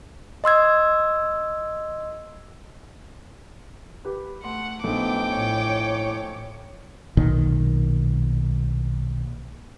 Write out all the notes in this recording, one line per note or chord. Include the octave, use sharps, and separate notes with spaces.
D#5 C6 E6 G#6
G4 B4
A3 F#5 C6
A#1 A3 B3 D#4 G5 D6
A2 C#5
B1 A#2 D#3